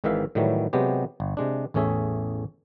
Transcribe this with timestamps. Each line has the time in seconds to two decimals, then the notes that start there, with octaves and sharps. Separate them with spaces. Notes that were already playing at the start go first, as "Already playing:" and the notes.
0.04 G#1 G#2 D#3 E3 E5 F5
0.35 A2 D#3 E3 F#3 G3 A3
0.73 C3 F#3 G#3 B3 G4
1.20 G1
1.37 C3 G#3 D4
1.74 A1 E2 A3 C#4 G#4 E5